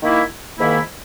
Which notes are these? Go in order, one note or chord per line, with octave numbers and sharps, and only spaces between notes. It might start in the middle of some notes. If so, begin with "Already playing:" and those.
D#3 A#3 E4
G#2 D#3 A#3 E4